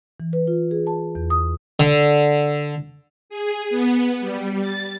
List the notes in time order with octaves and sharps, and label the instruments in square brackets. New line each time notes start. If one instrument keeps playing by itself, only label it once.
[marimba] E3
B4
F4
G#4
A5
E2
D#6
[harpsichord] D3
[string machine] G#4
B3
G3
A6